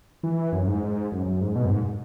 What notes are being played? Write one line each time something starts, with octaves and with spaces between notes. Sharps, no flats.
E3
F#2
G#2
F#2
F#2
G#2
B2
F#2
G#2